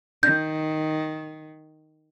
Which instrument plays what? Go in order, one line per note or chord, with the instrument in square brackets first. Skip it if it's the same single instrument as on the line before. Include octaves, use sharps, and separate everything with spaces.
[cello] D#3 [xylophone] G6